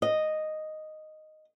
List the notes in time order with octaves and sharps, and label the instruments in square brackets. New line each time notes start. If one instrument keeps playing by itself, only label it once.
[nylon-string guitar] D#5